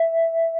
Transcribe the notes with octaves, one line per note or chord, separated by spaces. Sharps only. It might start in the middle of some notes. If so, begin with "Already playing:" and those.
Already playing: E5